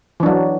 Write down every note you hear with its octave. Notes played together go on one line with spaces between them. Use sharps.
E3 F#3 D4